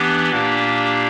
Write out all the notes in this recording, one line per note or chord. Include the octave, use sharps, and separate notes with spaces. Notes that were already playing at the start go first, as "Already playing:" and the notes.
Already playing: E3 B3 D4 G4
A#2 A#3 D4 G4